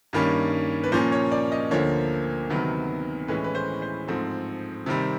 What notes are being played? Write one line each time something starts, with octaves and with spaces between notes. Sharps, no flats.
G2 D#3 G3 A#3 C#4
B4
A#2 F3 A#3 C#4 C5
C#5
D5
D#5
D2 D3 F3 A#3 C#5
D2 C3 D#3 F#3 B3
A2 E3 G#3 C#4 B4
B4
C5
C5
G#2 F3 A3 C4
C3 D#3 G3 C4